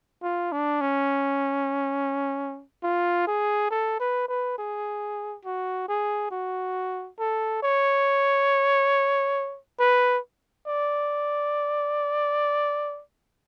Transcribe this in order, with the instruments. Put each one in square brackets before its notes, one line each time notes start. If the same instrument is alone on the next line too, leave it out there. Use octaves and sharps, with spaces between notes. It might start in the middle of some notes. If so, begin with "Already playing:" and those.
[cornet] F4
D4
C#4
F4
G#4
A4
B4
B4
G#4
F#4
G#4
F#4
A4
C#5
B4
D5